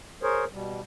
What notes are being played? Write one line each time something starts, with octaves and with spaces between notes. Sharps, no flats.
G#4 A#4 C5 C#5
B2 G3